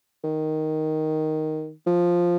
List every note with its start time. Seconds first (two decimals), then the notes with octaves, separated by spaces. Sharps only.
0.24 D#3
1.87 F3